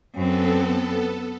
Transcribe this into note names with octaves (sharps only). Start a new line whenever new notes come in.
F#2 B3 C4 A4